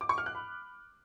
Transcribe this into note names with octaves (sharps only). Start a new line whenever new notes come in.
D6
C#6
F6
F#6
B5